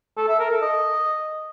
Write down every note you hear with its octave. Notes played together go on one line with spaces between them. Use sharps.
A4
E5
A#4
A4
D#5